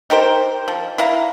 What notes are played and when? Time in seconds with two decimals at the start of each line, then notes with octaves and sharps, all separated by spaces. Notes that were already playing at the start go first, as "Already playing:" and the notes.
0.10 D#4 G4 A#4 C5
0.68 F3
0.98 E4 F5 A#5